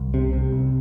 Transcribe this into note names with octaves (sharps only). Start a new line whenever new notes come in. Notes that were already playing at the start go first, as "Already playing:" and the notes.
Already playing: C2
C3
C3
C2